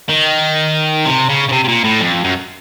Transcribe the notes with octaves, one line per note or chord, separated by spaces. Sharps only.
D#3
C3
C#3
C#3
C3
C3
A#2
A2
F2
F#2